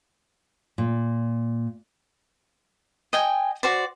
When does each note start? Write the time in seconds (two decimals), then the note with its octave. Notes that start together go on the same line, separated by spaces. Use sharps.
0.78 A#2
3.13 D#5 G5 G#5
3.63 F#4 C5 D5